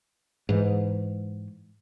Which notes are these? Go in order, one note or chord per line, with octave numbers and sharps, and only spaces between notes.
G#2 E3